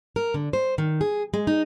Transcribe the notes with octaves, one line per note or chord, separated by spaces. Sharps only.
A#4
D3
C5
D#3
G#4
G#3
D#4